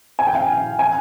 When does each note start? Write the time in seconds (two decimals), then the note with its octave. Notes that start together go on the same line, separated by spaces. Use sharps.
0.19 G#5
0.27 G5
0.35 F5
0.42 G5
0.79 G#5